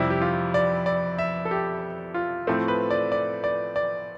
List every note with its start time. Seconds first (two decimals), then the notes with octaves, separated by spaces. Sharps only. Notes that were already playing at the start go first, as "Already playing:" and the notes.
Already playing: F2 C3 G3 E4
0.10 G4
0.22 F4
0.54 D5
0.86 D5
1.18 E5
1.45 A4
1.51 G4
2.14 F4
2.47 A2 F3 A3 C4
2.68 B4
2.90 D5
3.12 D5
3.44 D5
3.76 D5